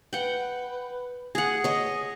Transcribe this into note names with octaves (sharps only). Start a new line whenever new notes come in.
B4 F#5 G5
G#4 F#5 D#6
C#5 D#5